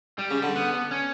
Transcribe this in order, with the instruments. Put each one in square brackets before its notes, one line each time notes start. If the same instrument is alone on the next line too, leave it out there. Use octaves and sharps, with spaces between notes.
[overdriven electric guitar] G3
[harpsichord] C#3
D3
[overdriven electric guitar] B3
C#4